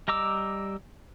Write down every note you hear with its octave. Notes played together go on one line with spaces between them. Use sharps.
G3 D#5 A#5 D6 E6